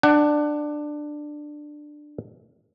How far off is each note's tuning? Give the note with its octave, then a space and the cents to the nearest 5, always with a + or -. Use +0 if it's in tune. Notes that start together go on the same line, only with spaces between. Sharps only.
D4 +15 F#5 +20